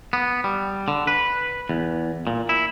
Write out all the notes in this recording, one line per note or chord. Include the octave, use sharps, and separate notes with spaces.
B3
G3
D3
B4
E2
A#2
E4